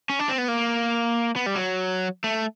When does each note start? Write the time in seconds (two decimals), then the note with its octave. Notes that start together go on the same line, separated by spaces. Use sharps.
0.09 C#4
0.19 D4
0.29 C4
0.38 B3
0.48 A#3
1.36 B3
1.46 G3
1.56 F#3
2.24 A3